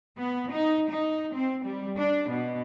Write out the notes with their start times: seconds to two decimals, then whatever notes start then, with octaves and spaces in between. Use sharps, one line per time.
0.16 B3
0.52 D#4
0.90 D#4
1.34 C4
1.65 G3
1.98 D4
2.30 B2